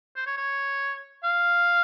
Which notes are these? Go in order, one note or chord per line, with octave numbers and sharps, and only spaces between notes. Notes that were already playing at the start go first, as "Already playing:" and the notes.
C5
C#5
C#5
F5